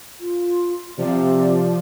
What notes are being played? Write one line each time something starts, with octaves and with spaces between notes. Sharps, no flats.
F4
C3 F3 D5